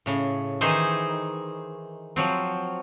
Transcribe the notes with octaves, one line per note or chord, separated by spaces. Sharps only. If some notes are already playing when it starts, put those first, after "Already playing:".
A2 C#3
D#3 E3 D#4 G#4 C5
F3 F#3 C4